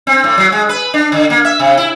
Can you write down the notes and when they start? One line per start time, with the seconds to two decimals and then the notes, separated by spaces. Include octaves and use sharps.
0.07 C4
0.24 A2
0.38 F#3
0.52 G#3
0.69 B4
0.94 D4
1.12 D3
1.30 A#3
1.45 E5
1.59 C3
1.77 E4